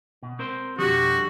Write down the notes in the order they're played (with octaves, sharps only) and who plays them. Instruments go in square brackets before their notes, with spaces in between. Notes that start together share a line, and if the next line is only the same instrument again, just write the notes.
[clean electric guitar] B2
C4 A#4 C5
[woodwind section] F2 B2 G4 [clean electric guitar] D3 F3 G3 [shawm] F#4